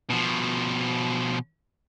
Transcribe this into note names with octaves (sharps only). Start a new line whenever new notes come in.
B2 F3